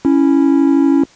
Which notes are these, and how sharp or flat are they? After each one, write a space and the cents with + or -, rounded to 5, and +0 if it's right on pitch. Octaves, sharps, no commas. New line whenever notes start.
C#4 +0 E4 +0